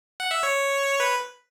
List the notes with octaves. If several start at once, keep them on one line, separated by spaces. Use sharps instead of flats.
F#5
E5
C#5
B4